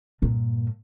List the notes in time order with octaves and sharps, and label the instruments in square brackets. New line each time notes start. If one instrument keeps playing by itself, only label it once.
[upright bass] G2 A#2